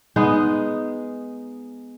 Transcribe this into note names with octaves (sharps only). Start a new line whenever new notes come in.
G#3 B3 D#4 G#4